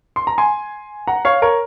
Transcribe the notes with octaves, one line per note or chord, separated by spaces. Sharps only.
C6
A#5
G#5 C6
F#5 A#5
C#5 F5
A#4 C#5